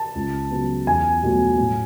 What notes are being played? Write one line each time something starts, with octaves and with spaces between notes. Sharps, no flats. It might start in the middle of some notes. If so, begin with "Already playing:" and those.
Already playing: A5
C#2
C#3 F#3 B3
E2 G#5
B2 F#3 A3
A2